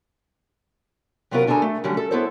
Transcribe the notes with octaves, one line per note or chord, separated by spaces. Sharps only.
C3 F#3 B3 C#4 F4 A#4
D2 D4 G#4 A4 G#5 A#5
A3
D3 F#3 G3 C#4
A4
B3 E4 A4 C5 C#5